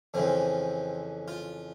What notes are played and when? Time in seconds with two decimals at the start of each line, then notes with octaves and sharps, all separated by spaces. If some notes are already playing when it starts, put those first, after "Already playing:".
0.14 F2 C#3 E3 C4
1.28 F4